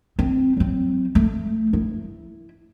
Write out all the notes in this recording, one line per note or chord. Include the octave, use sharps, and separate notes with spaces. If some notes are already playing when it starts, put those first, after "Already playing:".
C4
F#3 C4
A3
E4